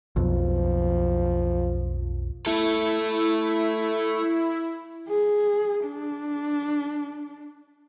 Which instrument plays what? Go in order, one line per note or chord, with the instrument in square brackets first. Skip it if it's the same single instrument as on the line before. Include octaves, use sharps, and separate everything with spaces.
[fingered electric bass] B1 F2 [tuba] F3
[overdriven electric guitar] A3 A4 [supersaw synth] E4
[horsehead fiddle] G#4
D4